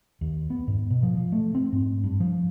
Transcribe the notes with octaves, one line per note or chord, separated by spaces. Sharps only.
D#2
B3
G#2
B2
F3
F3
A3
C4
G#2
G2
F3